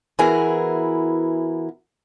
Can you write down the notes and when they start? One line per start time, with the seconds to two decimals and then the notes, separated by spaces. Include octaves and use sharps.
0.19 E3 B3 E4 F#4 G#4 A#4